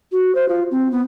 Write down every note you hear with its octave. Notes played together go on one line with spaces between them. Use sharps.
F#4
C5
F4
C4
B3